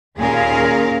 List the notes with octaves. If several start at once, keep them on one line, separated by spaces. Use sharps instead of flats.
D#2 A#2 C#4 G#4 A#4 F5